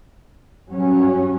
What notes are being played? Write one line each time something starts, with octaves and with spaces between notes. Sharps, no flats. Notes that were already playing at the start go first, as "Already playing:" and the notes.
G2 F#3 C#4